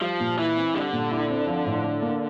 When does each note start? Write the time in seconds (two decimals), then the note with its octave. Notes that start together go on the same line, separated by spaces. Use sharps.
0.01 F3 G3
0.20 A#2
0.38 E3 E4
0.56 C4
0.75 D3 G3
0.93 A#2
1.11 E4
1.30 C4
1.47 F3
1.66 A2
1.84 D4
2.02 A#3